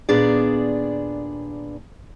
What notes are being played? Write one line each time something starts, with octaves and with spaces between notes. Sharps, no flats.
D#2 A#2 B3 D4 G#4 D5